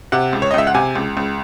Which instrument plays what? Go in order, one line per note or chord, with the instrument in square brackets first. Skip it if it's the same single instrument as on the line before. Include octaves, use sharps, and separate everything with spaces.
[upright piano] C3 F#5
C#2
C#5
D#5
C#2 E5
F#5
C3 G#5
C#2
C#2